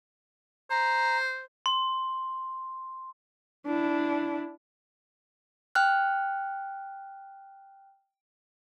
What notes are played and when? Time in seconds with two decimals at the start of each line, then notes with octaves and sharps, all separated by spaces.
0.70 C5 A#5
1.66 C6
3.66 D4 E4
5.75 G5 F6 F#6